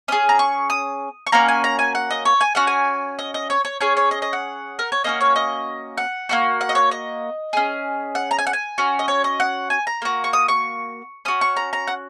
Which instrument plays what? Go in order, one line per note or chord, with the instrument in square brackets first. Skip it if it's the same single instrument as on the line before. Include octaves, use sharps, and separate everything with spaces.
[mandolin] C#4 G#4 D#6
A#5
C#6
D#6
C#6
A#3 C#4 F#4 A#5
G#5
A#5
G#5
F#5
D#5
C#5
G#5
C#4 F#4 F#5
G#5
D#5
D#5
C#5
C#5
C#4 G#4 C#5
C#5
D#5
D#5
F#5
A#4
C#5
A#3 C#4 F#4 D#5
C#5
D#5
F#5
A#3 C#4 F#4
F#5
D#5
C#5
D#5
C#4 G#4
F#5
A#5
G#5
F#5
G#5
C#4 F#4
D#5
C#5
D#5
F#5
G#5
A#5
A#3 F#4
C#6
D#6
C#6
C#4 F#4 D#6
C#6
A#5
A#5
F#5